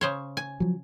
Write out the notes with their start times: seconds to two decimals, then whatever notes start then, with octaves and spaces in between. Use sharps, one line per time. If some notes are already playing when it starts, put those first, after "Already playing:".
0.01 C#3 C5 C#5
0.37 G#5
0.60 F3 F#3